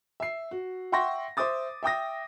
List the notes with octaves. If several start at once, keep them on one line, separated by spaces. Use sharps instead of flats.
E5 C7
F#4
E5 F#5 G5 C6 C#6 A#6
C5 E5 D6 D#6 A6
E5 G5 D#6 A#6